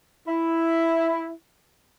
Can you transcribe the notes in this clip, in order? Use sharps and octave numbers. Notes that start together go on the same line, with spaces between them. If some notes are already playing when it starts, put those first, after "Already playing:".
E4